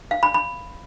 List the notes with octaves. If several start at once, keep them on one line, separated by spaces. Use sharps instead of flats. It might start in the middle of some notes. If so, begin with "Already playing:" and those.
F5
B5
B5